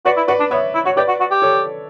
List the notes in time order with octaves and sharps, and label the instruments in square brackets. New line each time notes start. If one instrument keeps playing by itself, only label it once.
[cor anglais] F#4 [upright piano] B4 D5
[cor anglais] E4
[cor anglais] F#4 [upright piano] B4 D5
[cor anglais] D4
[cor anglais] B3 [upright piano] C#5 E5
[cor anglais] E4
[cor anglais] F#4 [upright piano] C#5
[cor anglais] G4 [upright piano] B4 D5
[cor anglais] F#4
F#4
G4
[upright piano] A4 C#5